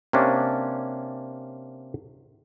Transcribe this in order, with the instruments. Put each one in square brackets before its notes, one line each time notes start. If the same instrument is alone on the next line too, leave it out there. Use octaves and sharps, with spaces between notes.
[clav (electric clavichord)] C3 A#3 C#4 D4